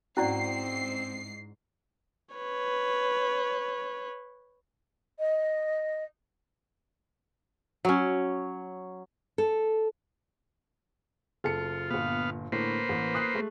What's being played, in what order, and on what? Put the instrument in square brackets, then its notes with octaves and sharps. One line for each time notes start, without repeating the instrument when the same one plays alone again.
[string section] G#2 C7 [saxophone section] C4 [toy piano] C#4 E4 D5 [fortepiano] F#4
[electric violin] B4 C#5
[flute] D#5
[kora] F#3 C#4
[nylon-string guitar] A4
[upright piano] F#1 A4 C#7 [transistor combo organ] F4
[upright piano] G1 A#2 [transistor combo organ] B3 F5
[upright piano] A2 D3 A3 [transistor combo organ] A#3 B4 C5
[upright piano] A1
D#6 F#6 C7
G#3 A3